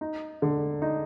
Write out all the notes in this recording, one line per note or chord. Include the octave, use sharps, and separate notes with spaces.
D#4
D3
D#4